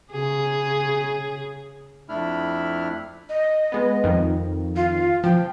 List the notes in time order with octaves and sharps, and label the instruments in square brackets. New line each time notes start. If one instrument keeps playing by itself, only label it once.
[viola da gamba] C#3 G#4
[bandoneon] F2 A3 D4 E4 B5 F6
[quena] D#5
[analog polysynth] G#3 B3
F2 D#3
[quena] F4
[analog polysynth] F3 [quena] G5